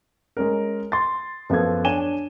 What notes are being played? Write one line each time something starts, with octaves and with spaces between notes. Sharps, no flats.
G#3 C#4 A#4
C6 A6
F#2 F3 B3 A4 G#6
D4 C#5 G#5 D#7 E7 G7